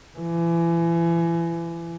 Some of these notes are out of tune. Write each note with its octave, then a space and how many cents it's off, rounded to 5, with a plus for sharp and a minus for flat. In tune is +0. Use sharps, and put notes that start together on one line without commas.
E3 +30